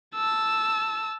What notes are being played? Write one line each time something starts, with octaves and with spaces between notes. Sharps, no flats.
A5 E6